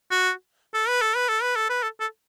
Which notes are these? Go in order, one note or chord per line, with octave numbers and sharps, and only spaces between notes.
F#4
A4
B4
A4
B4
A4
B4
A4
B4
A4
A4